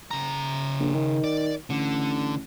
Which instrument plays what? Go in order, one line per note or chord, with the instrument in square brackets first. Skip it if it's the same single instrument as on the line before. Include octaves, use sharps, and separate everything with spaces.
[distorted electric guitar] C#3 A#5
[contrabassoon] A#1
D#3
[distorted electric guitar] D5
[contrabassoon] A1 [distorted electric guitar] D3